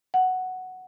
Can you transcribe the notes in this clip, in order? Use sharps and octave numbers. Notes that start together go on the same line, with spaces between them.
F#5